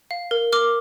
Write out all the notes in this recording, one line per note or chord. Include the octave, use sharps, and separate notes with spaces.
F5
A#4
A#4 D6 F6